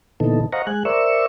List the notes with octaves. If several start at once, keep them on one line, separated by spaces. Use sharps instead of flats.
A#2 D3 E3 B3 D#4 A4
C5 D#5 F5 F#5 A#5 C#6
G#3 G#5 F#6
A#4 C5 D5 E5 C#6 E6